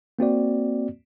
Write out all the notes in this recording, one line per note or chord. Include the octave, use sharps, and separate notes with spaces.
A#3 C4 F#4 D5